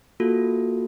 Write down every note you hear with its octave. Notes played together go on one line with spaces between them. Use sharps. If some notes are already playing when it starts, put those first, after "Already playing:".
A#3 F4 F#4 A4